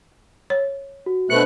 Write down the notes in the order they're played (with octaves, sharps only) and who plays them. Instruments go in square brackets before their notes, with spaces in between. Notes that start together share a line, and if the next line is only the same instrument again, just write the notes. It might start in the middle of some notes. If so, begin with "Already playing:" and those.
[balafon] C#5
[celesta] F#4
[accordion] B2 A3 F#6 [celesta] D4 C#7 [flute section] B4 C5 B5